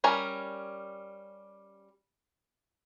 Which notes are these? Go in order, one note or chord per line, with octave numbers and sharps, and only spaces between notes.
G3 C#4 A#4 G#5